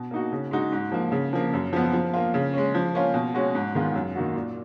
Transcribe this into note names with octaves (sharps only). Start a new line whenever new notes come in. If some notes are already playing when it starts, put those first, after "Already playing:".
Already playing: B2
A#3 D#4 F#4
C#3
G#3 D#4 F#4
G#2
F3 A#3
C#3
F3 A#3
F#2
F3 B3
F3
A#3 F4
C#3
G#3 C#4
F3
A#3 C#4 F4
B2
G#3 C#4 F#4
G#2
D#3 G#3 B3 F4
F#2
D#3 A#3 D#4 F#4
A#2